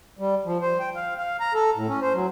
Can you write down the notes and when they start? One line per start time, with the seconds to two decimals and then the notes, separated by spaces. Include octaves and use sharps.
0.19 G3
0.45 F3
0.61 C5
0.80 G5
0.95 F5
1.18 F5
1.40 A#5
1.54 A4
1.75 A2
1.88 C#4
2.02 C5
2.13 F#3